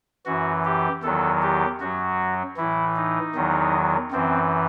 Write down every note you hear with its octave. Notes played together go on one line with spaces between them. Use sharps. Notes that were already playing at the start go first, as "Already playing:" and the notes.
F#2 E3 F#4
G4
E2 D#3 F#3 A4
G4
F#2 F#3 F#4
A2 E3 E4
D#4
E2 D#3 F#3
F#2 E3 C4